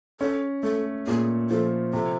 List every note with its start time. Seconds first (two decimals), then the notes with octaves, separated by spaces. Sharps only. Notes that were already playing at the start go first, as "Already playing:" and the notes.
0.20 C#4 A4
0.63 A3 A4
1.07 A#2 G#4
1.49 F3 A4
1.93 C3 A4